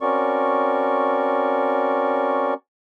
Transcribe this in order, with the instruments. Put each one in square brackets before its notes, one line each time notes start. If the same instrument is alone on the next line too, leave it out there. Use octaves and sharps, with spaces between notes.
[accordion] C4 C#4 F#4 A#4 D5 C#6